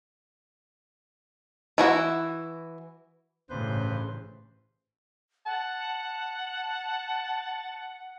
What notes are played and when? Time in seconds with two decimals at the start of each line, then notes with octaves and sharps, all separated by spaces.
1.78 E3 E4 F#4
3.50 A1 G2 C#3 B4 C5
5.46 F#5 A5